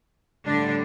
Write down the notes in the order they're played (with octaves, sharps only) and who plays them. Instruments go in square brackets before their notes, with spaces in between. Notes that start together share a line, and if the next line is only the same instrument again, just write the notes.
[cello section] A2 D3 G3 D4